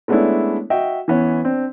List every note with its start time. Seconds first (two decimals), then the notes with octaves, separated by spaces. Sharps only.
0.08 G#3 A3 B3 C#4 D4 E4
0.70 F#4 D#5 E5 G5
1.08 E3 B3 C#4
1.45 C4 D4